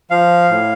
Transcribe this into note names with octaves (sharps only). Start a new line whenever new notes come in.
F3 F5
A2